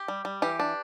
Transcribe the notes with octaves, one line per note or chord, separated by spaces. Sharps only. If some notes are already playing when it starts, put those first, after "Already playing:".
Already playing: G4
G3
G3
E3 G4
D4